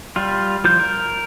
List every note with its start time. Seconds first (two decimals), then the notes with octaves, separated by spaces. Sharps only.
0.16 G3 F4
0.64 F3 F4 G6
0.80 A#4